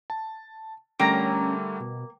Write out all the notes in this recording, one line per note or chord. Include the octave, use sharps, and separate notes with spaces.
A5
D3 G3 A3 A#3 C#4 G5 A#5
B2